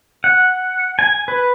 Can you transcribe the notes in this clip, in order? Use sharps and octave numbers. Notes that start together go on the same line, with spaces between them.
F#5
G#5
B4